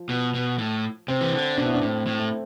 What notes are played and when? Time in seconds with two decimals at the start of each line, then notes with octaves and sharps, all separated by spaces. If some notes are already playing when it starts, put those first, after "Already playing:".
Already playing: F3
0.09 B2
0.34 B2
0.58 A2
1.08 C3 C4
1.21 E3
1.33 D3
1.57 B2 D4
1.66 E4
1.74 D4
1.82 A2 C4
2.06 A2
2.19 A3